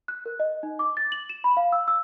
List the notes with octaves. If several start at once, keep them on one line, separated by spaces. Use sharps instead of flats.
F#6
A#4
D#5
D#4
D6
A6
F#7
E7
B5
F5
E6
E6